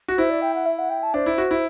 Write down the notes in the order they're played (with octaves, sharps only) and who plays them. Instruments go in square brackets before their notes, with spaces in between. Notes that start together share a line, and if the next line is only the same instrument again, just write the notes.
[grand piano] F#4
[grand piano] E4 [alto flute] C5
[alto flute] D5
G5
F#5
E5
F#5
G5
A5
[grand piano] D4 [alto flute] C5
[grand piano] E4
F#4
E4